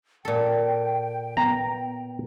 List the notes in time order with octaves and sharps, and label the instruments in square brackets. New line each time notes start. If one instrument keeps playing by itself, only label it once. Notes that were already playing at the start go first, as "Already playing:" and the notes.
[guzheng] A#2 A4 [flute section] G5
[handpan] B3 [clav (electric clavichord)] A#5